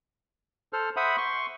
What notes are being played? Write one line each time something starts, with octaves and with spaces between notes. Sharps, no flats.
A4 C5 F6
C5 E5 F#5 B5 D#6
C6 C#6